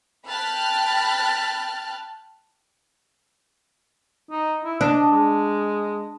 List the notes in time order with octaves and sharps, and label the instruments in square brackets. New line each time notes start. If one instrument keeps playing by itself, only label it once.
[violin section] G5 A5 B5 F6 F#6 A6
[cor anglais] D#4
E4
[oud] D4 [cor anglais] D#5
[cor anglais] G#3